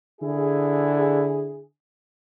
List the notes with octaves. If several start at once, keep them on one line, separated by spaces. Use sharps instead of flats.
D3 E4 G#4